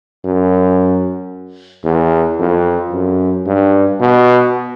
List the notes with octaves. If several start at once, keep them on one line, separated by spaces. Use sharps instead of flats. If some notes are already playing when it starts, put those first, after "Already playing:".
F#2
E2
F2
F#2
G2
B2